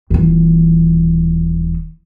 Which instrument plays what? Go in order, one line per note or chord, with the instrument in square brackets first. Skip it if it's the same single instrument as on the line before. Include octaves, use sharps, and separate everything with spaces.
[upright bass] D#1 E3